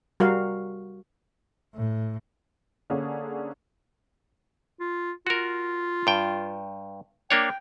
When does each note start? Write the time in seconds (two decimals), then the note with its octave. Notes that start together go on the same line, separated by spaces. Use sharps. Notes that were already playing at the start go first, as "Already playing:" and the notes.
0.20 G3 F#4 A#4 F5
1.74 A2
2.90 D3 A#3 C#4 D4 G#4
4.80 F4
5.27 F4 F#4 A#4
6.07 G2 G5
7.30 A#3 D4 C#5 G5